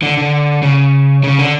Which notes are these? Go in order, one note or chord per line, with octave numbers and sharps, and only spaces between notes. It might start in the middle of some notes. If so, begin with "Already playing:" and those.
D3
D3
C#3
C#3
D3